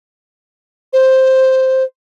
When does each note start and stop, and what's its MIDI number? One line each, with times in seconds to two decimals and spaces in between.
0.93 1.84 72